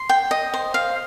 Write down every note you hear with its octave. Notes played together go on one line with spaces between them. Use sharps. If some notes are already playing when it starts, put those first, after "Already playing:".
Already playing: C6
G5
D#5
C5
F5